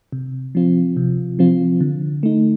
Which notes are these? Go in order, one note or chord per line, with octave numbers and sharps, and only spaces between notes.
C3
F3 C4 F4
C3
F3 C4 F4
D3
A3 D#4